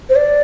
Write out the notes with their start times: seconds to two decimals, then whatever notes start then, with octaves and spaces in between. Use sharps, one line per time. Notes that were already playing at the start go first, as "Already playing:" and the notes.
0.09 C5
0.16 D5